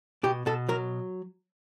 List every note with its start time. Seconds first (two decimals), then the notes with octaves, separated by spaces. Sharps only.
0.23 B2 G4
0.46 B2 A4
0.68 F#3 A#4